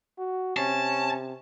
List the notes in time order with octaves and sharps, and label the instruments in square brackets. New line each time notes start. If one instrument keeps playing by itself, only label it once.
[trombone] F#4
[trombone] C3 [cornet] C#4 [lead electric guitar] A5